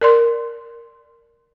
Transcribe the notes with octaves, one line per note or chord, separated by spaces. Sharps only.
A#4 D5 C6